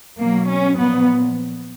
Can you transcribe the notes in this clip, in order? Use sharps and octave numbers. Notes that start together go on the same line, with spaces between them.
B2 F#3 A#3
C#4
A#2 F3 B3